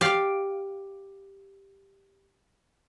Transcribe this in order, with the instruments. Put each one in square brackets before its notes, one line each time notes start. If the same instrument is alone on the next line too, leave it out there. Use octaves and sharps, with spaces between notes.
[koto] G4 D5 F5